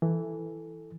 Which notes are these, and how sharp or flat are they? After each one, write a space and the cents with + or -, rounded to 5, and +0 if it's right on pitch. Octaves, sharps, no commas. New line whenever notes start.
E3 +0 A4 +0